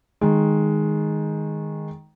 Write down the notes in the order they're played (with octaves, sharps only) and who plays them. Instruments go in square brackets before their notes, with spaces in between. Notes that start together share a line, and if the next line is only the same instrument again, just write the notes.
[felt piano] D#3 G#3